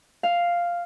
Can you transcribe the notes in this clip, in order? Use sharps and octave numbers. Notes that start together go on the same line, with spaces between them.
F5